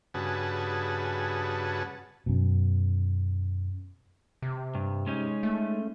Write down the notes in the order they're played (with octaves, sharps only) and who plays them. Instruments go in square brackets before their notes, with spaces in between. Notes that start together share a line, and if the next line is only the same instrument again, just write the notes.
[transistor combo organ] G2 C#3 F#4 G#4 B4 A5
[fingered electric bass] F#2 B2
[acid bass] C3
[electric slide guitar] G2
G#3 C#4 D#4
[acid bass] A3